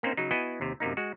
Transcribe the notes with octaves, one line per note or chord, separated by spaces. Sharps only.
A#3 C4 C#4 D#4 C5
C#3 F#3 D#4
B3 E4 F#4 D#5 G#5
D#2 C3
F#2 C3 A#3 D#4
G#3 F#4